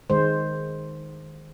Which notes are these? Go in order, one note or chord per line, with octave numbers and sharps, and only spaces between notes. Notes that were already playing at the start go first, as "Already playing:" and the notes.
D#3 G#3 C5